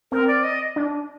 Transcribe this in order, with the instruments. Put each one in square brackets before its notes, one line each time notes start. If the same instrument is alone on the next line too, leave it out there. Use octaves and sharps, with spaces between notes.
[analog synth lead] C4 [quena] A#4
[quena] D5
D#5
[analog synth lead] D4